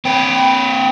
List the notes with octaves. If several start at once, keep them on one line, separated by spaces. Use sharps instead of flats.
C4 B4 G5